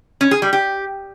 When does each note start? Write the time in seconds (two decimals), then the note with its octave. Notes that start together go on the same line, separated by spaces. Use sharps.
0.21 C#4
0.31 G#4
0.42 G3
0.53 G4